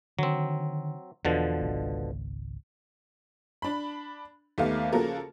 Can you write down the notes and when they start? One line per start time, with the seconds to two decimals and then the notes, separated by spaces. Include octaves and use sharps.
0.19 D3 D#3 F#3 C4
1.25 E2 B2 D3 F3
1.61 G#1 C#2
3.62 D4 B5
4.58 D#2 A3 B3 F5
4.92 C#3 F3 A#3 F#4 A4 A#4